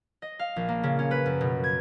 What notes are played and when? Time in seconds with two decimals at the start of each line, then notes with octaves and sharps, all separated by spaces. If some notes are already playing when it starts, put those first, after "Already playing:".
0.22 D#5
0.39 F5
0.56 A#1
0.69 A#3
0.83 C#3
0.99 C#4
1.11 B4
1.26 F#2
1.41 B2
1.64 G#6